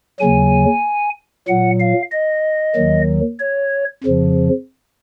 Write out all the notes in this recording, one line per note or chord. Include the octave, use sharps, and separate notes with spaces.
D#2 C#3 F#3 G#5
A#2 F#3 F#5
F5
D#5
D#2 D#3 F#3
C#5
F2 C#3 F3